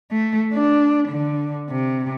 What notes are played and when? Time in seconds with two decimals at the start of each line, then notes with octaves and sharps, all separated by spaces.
0.12 A3
0.53 D4
1.08 D3
1.70 C3